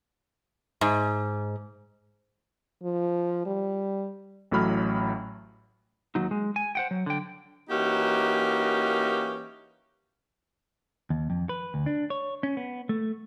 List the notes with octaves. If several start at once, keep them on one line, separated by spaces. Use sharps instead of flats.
G#2
F3
G3
A1 A2 F#3 B5 F6
D#2 F#3 D#4
G#3
G#5
C5 F#5 G5
F#3
D3 G5
E3 A#3 C#4 D#4 F#4 G4
D#2
F2
B4
D2
D4
C#5
C#4
B3
A3